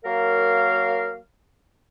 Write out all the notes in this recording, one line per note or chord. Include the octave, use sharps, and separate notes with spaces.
F#3 A#3 A#4 C#5 F5